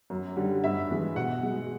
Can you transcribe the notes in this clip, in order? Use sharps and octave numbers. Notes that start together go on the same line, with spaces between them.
F#2
D3 G3
G2 E5
E3 G#3
B2 F#5
G#3